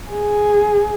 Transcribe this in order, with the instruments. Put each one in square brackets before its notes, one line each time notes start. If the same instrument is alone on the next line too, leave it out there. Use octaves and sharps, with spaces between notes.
[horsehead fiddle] G#4